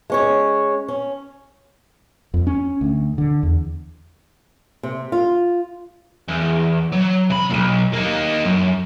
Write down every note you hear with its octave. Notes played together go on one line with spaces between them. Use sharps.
G#3 C#4 C#5
C#4
F2
C#4
D2
D3
E2
C3
F4
E2
F#3
C3 B5
B1 A#2
A#3 D#4
F#2